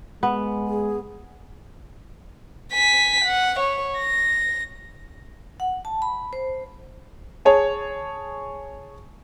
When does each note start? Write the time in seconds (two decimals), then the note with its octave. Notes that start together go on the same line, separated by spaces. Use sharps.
0.23 G#3 B3
0.67 G#4
2.73 G#5 B6
3.25 F#5
3.59 C#5
3.98 A#6
5.60 F#5
5.85 A5
6.02 B5
6.33 C5
7.45 G#4 C#5 A5